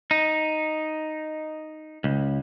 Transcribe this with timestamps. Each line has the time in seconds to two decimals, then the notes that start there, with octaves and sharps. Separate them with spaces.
0.11 D#4
2.04 C#2